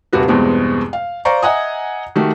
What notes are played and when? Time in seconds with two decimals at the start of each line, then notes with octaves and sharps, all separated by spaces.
0.13 D#1 C3 F#4 B4
0.28 E2 G2 B2 G#3 C4
0.93 F5
1.25 C5 D5 F5 A#5 C#6
1.43 D#5 E5 F#5 G#5 A#5 D#6
2.16 D#3 A3 F#4 G4